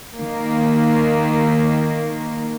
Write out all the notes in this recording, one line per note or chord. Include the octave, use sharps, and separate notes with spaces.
D#3 A#3